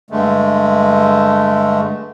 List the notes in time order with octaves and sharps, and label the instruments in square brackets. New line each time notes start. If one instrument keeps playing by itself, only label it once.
[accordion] G2 D3 G#3 A3